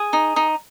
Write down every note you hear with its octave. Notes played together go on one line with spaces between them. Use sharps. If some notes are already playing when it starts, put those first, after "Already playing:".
Already playing: G#4
D#4
D#4